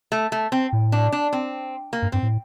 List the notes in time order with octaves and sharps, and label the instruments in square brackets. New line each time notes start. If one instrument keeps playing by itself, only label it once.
[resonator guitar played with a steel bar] A3
A3
C4
[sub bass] A2
[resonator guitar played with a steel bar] D4
D4
C4
A#3
[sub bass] G2
[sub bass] G2 [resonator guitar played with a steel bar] C4
[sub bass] A2